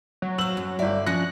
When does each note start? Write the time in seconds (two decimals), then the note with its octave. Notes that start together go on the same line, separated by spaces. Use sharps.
0.22 F#3
0.38 C5 F5 E6 F#7
0.57 F#2
0.79 G1 D5 E5
1.07 F3 C#4 F#6 A#6 C#7